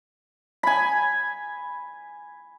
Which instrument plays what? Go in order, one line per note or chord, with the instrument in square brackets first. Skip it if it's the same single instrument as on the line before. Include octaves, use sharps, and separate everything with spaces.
[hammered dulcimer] G#5 B5